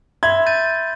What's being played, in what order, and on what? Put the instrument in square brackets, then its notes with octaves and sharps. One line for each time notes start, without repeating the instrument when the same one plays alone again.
[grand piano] E5 G#6 [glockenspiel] B5 C6
[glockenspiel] G6 A6 D#7